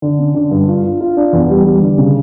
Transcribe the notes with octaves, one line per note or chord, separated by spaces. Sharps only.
D3
C#4
D3
G2
F4
F4
F4
D4
E2
G3
G3
D3
C#3